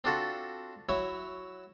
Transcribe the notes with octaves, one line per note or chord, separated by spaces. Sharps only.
C4 D4 F4 F#4 A4
F#3 E4 C#5 E5